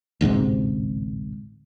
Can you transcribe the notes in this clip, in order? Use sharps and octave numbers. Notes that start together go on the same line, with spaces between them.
A1 D2 G#2 C3